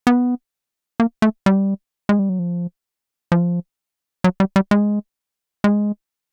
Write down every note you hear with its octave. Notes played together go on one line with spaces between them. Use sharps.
B3
A#3
A3
G3
G#3
G3
F#3
F3
F3
F#3
G3
G3
G#3
G#3